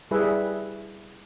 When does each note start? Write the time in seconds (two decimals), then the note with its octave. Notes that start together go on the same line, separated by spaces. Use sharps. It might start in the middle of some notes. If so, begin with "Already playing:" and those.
0.11 G3 E4 G#4 B4 E5